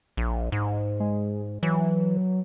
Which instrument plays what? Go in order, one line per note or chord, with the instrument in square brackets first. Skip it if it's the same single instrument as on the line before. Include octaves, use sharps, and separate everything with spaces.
[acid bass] A#1
G#2
[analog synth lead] G#3
[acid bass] E3 [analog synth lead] F#3